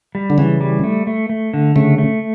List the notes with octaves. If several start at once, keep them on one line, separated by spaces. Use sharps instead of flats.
G3
D3
C#3 E3
G3
A3
A3
A3
D3
C#3 A3
A3